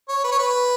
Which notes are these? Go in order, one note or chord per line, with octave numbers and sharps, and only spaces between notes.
C#5
B4
C#5
B4